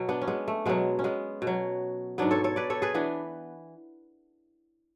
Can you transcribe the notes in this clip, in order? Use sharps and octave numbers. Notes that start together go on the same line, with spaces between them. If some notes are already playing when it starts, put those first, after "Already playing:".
Already playing: B2 F#3
B3 D4
C#4
G#3 B3
A3
B2 F#3 G#3 B3
C#4
G#3 B3
B2
F#3
G#2 F#3 B3 D4
A4 C#5
A4 C#5
B4 D5
A4 C#5
G#4 B4
E3 B3 D4